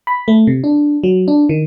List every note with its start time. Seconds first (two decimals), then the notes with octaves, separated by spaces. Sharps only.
0.07 B5
0.28 A3
0.47 C3
0.64 D4
1.03 F#3
1.28 D4
1.49 D#3